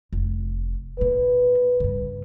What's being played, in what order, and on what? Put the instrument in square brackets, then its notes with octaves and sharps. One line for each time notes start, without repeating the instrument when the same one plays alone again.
[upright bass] F1
[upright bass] A#2 A#3 [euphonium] B4
[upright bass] G2 C#3